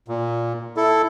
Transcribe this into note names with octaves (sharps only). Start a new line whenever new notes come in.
A#2
E4 A4